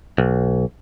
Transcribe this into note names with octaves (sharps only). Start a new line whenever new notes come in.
B1